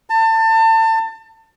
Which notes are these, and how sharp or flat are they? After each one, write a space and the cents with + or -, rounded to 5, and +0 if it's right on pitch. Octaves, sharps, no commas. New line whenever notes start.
A5 +30